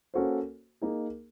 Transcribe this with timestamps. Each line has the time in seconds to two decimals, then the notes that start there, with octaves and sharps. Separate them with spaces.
0.14 A#3 C#4 F#4 A4 C5
0.82 A#3 D#4 G#4